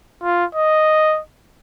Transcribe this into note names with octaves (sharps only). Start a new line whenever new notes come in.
F4
D#5